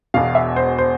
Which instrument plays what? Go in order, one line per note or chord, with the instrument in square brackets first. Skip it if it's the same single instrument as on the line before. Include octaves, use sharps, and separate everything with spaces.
[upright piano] E1 E2 B2 F5
E5
C5
C5